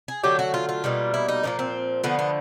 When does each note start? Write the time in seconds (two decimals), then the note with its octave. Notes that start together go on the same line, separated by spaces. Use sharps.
0.08 G#4
0.23 D3 F#3 A3 G4
0.39 F#4
0.54 F4
0.69 F4
0.84 B2 G3 A#3
1.14 E4
1.28 D#4
1.43 A#2 F3 A#3 C#4
1.59 C4
2.04 D3 F3 A3 B3
2.19 B3